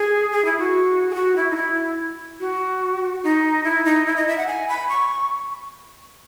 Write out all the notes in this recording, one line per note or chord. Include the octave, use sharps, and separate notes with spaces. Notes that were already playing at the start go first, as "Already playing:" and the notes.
Already playing: G#4
G#4
E4
F#4
G#4
F#4
E4
D#4
E4
F#4
D#4
E4
D#4
E4
D#5
E5
F#5
G#5
B5
C#6